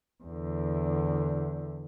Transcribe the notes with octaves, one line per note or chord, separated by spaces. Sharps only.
E2 D3